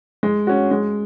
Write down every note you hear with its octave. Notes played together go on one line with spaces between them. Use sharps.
G#3
C#4 F#4
G#3